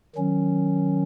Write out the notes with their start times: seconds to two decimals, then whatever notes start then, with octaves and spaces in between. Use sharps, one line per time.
0.16 D#3 F#3 C#4